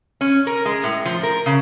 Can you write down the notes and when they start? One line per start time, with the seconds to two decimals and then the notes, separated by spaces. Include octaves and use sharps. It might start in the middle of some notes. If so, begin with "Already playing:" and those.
0.21 C#4
0.47 A#4
0.65 G#3
0.84 A2
1.05 F3
1.23 A#4
1.46 C#3